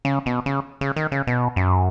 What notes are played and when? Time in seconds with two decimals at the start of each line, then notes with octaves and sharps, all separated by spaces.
0.05 C#3
0.26 B2
0.46 C#3
0.81 C#3
0.96 D#3
1.12 C#3
1.27 B2
1.56 F#2